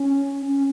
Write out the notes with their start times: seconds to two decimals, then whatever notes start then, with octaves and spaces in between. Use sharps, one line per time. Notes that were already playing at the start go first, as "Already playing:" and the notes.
Already playing: C#4
0.48 C#4